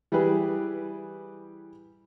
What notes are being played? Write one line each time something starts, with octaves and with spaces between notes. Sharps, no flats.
E3 G3 G4 G#4 B4